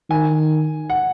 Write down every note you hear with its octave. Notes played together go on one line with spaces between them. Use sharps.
D#3 G#5
F#5